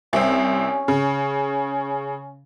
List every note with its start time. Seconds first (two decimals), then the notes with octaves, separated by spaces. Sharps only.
0.13 C2 C4 C#4
0.88 C#3